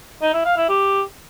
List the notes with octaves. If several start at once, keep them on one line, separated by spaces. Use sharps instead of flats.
D#4
E4
F5
E4
G4